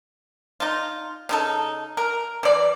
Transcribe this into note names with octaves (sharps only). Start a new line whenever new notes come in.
D#4 F4
C#3 D#4 A4
A#4
E3 D5